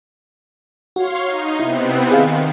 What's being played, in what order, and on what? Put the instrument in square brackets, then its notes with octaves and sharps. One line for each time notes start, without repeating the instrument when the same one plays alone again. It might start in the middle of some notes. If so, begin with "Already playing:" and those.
[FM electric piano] F#4 [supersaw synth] C#5 F5 C6
[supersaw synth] D#4
[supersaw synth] C3 B3 C4 [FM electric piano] E4
[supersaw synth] D#3 [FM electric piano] G#4 D#5 F5